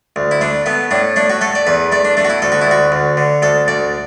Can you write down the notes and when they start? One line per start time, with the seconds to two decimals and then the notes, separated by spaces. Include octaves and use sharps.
0.16 D2
0.31 E4
0.41 A3 D4
0.66 A3 B3
0.91 A2 D4
1.16 A3 D4
1.30 F#4
1.41 A3 A4
1.55 D5
1.67 E2 B4
1.92 A3 D5
2.05 D4
2.17 A3 D4
2.25 F#4
2.30 E4
2.42 D2 A4
2.52 F#4
2.61 E4
2.67 D2 F#4
2.92 D2
3.17 D3
3.42 D2 A4
3.68 D2 D5